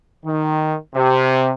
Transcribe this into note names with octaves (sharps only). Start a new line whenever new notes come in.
D#3
C3